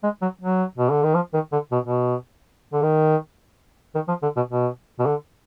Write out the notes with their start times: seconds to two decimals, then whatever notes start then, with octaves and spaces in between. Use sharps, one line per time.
0.03 G#3
0.22 F#3
0.41 F#3
0.78 B2
0.91 D3
1.03 D#3
1.15 F3
1.34 D#3
1.52 D3
1.72 B2
1.86 B2
2.73 D3
2.83 D#3
3.95 D#3
4.08 F3
4.23 D3
4.37 B2
4.51 B2
4.99 B2
5.06 D3